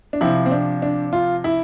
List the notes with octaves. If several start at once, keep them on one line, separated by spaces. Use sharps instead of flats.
D4
C3 F3 E4
C4
D4
D4
F4
E4